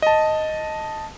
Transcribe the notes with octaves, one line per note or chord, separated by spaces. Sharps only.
D#5 A5